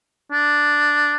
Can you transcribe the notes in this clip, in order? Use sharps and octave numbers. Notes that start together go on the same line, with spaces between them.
D4